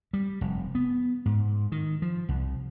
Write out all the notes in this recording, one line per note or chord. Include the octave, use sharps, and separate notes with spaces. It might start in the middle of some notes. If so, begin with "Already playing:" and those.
G3
F1
B3
G#2
D#3
F3
C2